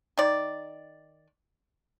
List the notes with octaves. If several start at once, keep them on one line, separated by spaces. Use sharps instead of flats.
D#3 D5